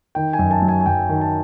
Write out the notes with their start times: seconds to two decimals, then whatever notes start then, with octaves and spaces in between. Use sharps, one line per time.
0.15 D#3 G5
0.33 G#5
0.39 F#2
0.51 A5
0.62 F#3
0.68 G#5
0.81 G#5
0.86 F#2 G5
1.09 D#3
1.21 A5